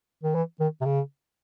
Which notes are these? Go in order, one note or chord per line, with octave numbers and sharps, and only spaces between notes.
D#3
E3
D#3
C3
C#3